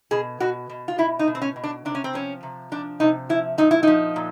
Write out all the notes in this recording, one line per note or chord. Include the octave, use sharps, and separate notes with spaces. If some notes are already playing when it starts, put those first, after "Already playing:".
B2 G#4
B2 F#4
B2
F4
B2 E4
D#4
B2
C4
C#4
B2
D4
C3 D4
C#4
C4
F3 C#4
C3
F3 D4
C3 D#4
F3 E4
A#2 D#4
E4
F3 D#4
A#2